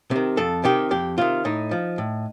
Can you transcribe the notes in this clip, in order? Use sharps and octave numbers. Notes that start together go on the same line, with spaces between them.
C3 D#3
F2 A4
C3 D#3 G4
F2 G4
C3 D#3 F4
A2 D#4
F3
A2